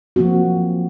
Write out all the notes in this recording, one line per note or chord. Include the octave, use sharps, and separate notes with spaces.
F3 F#3 A#3 C4 F#4